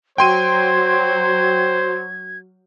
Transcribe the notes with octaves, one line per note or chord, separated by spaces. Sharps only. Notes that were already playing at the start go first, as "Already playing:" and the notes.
F#3 C5 G5 C6 G#6 D#7